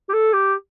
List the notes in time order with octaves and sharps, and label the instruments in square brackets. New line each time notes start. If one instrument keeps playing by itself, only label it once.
[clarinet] G4
A4
G4